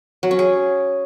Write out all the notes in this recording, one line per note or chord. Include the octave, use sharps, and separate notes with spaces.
F#3
C#4
G#4